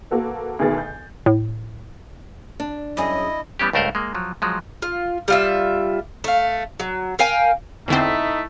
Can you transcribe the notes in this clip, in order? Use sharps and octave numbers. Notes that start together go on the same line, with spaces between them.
A#3 F#4 A4 B4
D2 B2 D#3 G#4 B4 A6
G6
A2
D4
F#2 E4 G#4 D#5
E3 G3 B3 C#4 G4
C#2 G2 A3 A#4 C5 F#5
G#3 A#3
F3 F#3
F3 F#3 G#3
F4
G3 F4 E5
A3 F5
F#3
A#4 F5 G5 G#5
E2 D3 A3 C4 D#4 E4